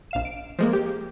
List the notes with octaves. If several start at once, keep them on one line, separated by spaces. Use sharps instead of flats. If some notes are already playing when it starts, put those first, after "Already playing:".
A#1 F5 E7
D7
F3 G#3 A#3
G4